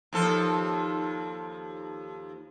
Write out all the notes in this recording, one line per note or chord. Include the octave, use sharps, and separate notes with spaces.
D#2 F3 A4